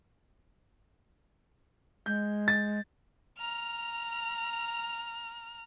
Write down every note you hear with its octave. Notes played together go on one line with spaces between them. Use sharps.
G#3 G6
A6
A#5 F6